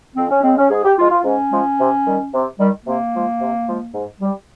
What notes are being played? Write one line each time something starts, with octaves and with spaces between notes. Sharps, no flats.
F2 C4
C#4
C#3 G#3 C4
C#4
G#2 G#4
G4
F3 G#3 F4
F4
G#2 C#4
F3 G#3
C3
D#3 G3
C3
D#3 G3
C3 A#3
F3 G#3
C3
F3 G#3
G#2
G3